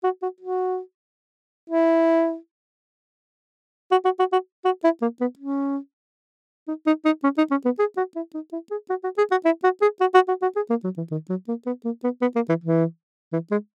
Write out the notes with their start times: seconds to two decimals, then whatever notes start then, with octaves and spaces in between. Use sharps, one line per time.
0.04 F#4
0.22 F#4
0.40 F#4
1.70 E4
3.91 F#4
4.05 F#4
4.19 F#4
4.32 F#4
4.65 F#4
4.84 E4
5.02 A#3
5.21 B3
5.39 C#4
6.68 D#4
6.87 D#4
7.05 D#4
7.24 C#4
7.38 D#4
7.51 C#4
7.65 B3
7.79 G#4
7.97 F#4
8.16 E4
8.34 D#4
8.53 E4
8.71 G#4
8.90 F#4
9.04 F#4
9.18 G#4
9.31 F#4
9.45 E4
9.64 F#4
9.82 G#4
10.01 F#4
10.14 F#4
10.28 F#4
10.42 F#4
10.56 G#4
10.70 A#3
10.84 F#3
10.97 E3
11.11 D#3
11.30 F#3
11.48 A#3
11.66 B3
11.85 A#3
12.04 B3
12.22 B3
12.36 A#3
12.49 E3
12.64 E3
13.33 E3
13.51 G#3